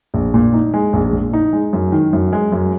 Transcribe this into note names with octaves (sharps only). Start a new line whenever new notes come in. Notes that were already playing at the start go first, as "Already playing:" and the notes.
A#1
A#2
D#4
G#3
A#1
A#2
D#4
G#3
F#2
D#3
F#2
G#3
F#2